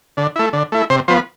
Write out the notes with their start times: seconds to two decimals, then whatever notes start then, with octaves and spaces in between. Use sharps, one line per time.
0.17 D3
0.36 A3 E4
0.53 D3
0.72 A3 E4
0.90 C3 C5
1.08 F3 B3 C5